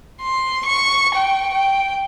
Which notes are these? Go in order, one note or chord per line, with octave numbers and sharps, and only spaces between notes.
C6
C#6
G5
G5